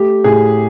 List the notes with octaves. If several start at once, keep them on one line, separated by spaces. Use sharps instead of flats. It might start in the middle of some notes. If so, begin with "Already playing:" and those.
Already playing: A3 G4
A2 G#4